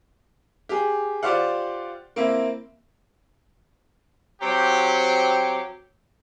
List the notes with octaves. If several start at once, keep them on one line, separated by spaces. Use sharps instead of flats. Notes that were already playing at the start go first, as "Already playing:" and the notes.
G4 G#4
F4 G4 C5 D5 F5 F#5
A#3 C4 E4
F#3 C4 G4